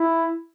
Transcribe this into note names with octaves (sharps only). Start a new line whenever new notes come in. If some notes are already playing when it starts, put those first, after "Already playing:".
Already playing: E4